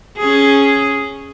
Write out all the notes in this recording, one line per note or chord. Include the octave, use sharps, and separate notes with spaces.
C#4 G#4